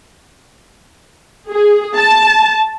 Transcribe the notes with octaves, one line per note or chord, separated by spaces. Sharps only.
G#4
A5